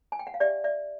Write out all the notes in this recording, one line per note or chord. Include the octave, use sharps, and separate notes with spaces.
G#5
G5
F#5
F5
G4 D5 E5
D5 E5